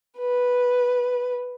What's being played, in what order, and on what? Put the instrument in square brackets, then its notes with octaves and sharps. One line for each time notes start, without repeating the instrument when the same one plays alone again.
[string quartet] B4